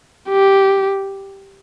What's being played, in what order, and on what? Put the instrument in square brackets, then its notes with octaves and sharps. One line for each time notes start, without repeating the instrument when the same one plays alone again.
[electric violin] G4